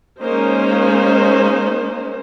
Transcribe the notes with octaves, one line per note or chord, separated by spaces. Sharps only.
G#3 A#3 C#4 D#4 C5